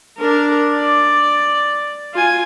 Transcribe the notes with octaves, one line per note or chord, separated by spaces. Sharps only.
D4 A#4
D5
F4 G#5